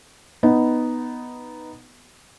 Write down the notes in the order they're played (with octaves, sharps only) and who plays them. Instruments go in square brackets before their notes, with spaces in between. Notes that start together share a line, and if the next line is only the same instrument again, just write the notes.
[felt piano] B3 D#4